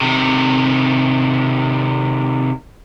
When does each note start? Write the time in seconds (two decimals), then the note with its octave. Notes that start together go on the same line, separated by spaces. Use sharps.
0.01 C3 D#3